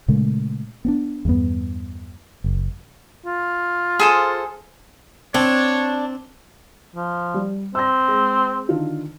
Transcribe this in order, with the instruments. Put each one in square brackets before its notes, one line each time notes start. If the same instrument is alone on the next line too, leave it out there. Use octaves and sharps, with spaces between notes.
[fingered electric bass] A#2 C#3 G#3 A3
B3 C4 D4
E2 G2 B3
F#1
[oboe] F4
[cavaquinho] G#4 A4 C5
[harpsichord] C4 [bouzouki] D4 [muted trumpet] C#5
[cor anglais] F3
[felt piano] G3
[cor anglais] C4 [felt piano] E6 A#6
[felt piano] G#3
D3 D#3 F4